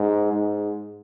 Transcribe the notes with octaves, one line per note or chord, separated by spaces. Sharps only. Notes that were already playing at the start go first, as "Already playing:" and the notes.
Already playing: G#2
G#2